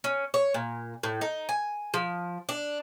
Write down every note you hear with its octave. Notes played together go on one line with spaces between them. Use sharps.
C#4
C#5
A#2
A2
D#4
G#5
F3
D4